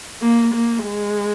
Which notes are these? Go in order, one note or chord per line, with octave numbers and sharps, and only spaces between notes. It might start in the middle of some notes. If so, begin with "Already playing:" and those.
A#3
A#3
G#3